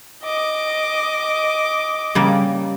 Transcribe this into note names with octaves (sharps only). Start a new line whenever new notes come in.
D#5 D6
C#3 G3 A#3